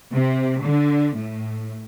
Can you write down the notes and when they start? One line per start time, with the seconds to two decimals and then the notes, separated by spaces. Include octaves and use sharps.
0.14 C3
0.63 D3
1.16 A2